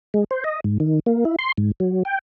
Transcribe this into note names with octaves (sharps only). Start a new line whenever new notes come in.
G#3
C5
D#5
G#2
D#3
A#3
E4
C6
G#2
F#3
G5